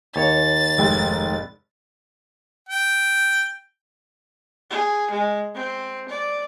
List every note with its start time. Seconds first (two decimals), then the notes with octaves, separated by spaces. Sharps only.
0.16 D#2 C#5 A6
0.78 F1 G#2 G5
2.69 G5
4.70 G#4
5.11 G#3
5.55 C4
6.09 D5